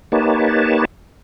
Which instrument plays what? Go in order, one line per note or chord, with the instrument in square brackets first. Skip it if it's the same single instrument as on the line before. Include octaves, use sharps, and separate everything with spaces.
[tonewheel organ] A#3 D#4 G4 B4 C#5 A5